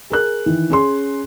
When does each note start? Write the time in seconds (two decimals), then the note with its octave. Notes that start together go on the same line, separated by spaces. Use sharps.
0.10 G#4 A#4 F#6
0.46 D#3 E3
0.70 C#4 G#4 C6